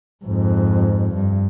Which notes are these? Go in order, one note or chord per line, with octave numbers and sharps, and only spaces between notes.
F2 G#2
G2